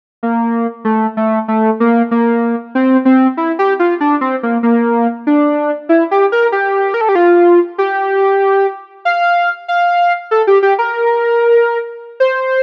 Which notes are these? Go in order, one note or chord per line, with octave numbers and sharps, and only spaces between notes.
A#3
A3
A3
A3
A#3
A#3
C4
C4
E4
G4
F4
D4
C4
A#3
A#3
D4
E4
G4
A#4
G4
A#4
A4
G4
F4
G4
F5
F5
A4
G4
G4
A#4
C5